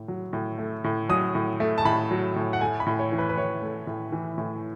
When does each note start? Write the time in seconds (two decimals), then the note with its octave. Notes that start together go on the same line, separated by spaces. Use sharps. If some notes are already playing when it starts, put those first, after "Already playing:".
Already playing: A2
0.08 F#3
0.33 A2
0.58 A3
0.84 A2
1.09 F#3 D#6
1.35 A2
1.60 A3
1.78 A5
1.85 A2 B5
2.11 F#3
2.36 A2
2.53 F#5
2.61 A3 G#5
2.80 B5
2.86 A2
2.99 C#5
3.12 E3
3.18 B4
3.29 B4
3.37 A2 C#5
3.62 A3
3.87 A2
4.12 E3
4.38 A2